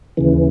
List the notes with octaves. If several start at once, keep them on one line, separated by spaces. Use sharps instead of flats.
D#2 C#3 E3